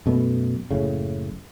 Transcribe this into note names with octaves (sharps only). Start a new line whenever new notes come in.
F#2 B2 A3 B3
F#1 A2 C#3